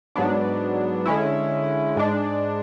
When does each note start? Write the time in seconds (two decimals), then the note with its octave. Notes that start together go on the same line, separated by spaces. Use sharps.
0.16 G#2 F#3 B3 D4
1.06 D3 G#3 C#4 E4
1.96 G#2 G#3 D4